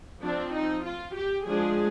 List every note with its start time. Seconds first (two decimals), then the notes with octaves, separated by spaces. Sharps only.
0.22 F3 C4 D4
0.54 D#4
0.84 F4
1.15 G4
1.46 F3 G#3 D4 G#4